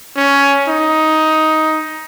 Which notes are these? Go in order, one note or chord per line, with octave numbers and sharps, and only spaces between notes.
C#4
D#4